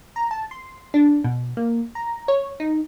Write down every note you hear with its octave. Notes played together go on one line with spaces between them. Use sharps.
A#5
A5
C6
D4
B2
A#3
A#5
C#5
D#4